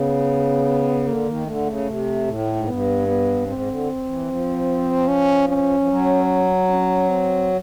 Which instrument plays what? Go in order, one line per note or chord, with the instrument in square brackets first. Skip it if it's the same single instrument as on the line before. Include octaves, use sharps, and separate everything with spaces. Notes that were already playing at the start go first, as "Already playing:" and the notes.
Already playing: [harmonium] C#3 [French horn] B3
[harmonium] D3 [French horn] A#3
[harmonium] D#3
[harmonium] D3 [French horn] A3
[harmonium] C#3
C3
A2
G#2
[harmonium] G2 [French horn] B3
[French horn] B3
[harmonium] G#2 [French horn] C4
[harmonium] D3
E3
F3
[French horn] C#4
C#4
[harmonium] F3
F#3
[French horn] C#4
C4